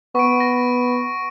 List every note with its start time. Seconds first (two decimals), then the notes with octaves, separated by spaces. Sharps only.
0.15 B3 C#6 D7
0.40 A#6